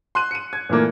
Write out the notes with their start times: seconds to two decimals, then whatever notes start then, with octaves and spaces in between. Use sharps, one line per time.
0.15 C6 F#6 D#7
0.31 C#7 D#7
0.53 G#6
0.70 A#2 E3 A3 A#3